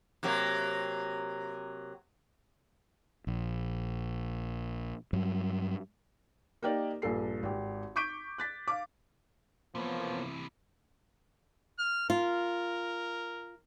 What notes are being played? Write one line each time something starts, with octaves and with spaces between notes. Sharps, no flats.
C3 F#3 A#3
A#1
G2 F#3
A#3 D#4 G4 A#4 D5
A#1 G2 A4 C7
G#1 G4
C#6 D6 G6 B6 D7
F#6 A6 B6
F5 D6
C3 E3 F3 A#3 B3 C#5
F6
F4 A#4